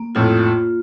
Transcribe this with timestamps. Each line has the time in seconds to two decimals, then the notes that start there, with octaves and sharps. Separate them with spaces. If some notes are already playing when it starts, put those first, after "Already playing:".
Already playing: A#3
0.15 F2 A2 F4